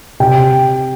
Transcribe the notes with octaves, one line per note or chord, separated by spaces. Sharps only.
C3 G4 G5